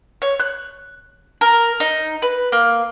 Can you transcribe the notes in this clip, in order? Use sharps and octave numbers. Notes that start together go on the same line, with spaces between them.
C#5
F#6
A#4
D#4
B4
A#3